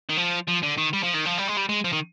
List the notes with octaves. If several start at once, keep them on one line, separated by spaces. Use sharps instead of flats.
D#3
F3
F3
D3
D#3
G3
F3
D#3
F3
G3
G#3
G3
G#3
F3
D#3